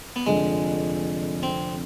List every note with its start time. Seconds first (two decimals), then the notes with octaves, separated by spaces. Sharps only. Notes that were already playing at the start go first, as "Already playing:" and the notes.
0.16 B3
0.26 F1 F2 D3 G#3
1.43 C4